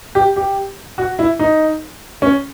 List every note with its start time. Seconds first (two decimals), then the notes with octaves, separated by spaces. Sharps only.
0.15 G4
0.36 G4
0.98 F#4
1.19 E4
1.39 D#4
2.22 C#4